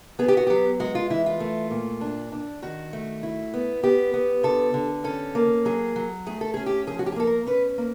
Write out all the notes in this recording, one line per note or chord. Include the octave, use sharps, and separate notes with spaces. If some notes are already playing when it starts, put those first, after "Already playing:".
B3 G#4
G4
F#4
F#3 G4
G#3 F#4
F4
E3 E4
F4
A3
A#2
D4
D4
D#3 F#4
A3
E4
B3
B3 G4
B3
D3 A4
D3
C#4 A4
A#3
F#3 G#4
F#3
A3 G#4
A4
C#4 G#4
G4
F3 G#4
F#4
G4
G#4
A#3 A4
A#4
C#4 B4
A#3